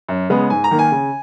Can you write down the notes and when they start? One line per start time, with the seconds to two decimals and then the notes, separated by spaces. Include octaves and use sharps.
0.09 F#2
0.30 C#3 G#3 B3
0.50 G#2 G#5
0.64 A#5
0.71 D#3 A#3
0.79 G#5
0.92 C#3